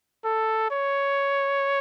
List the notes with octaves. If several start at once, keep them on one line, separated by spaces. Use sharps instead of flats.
A4
C#5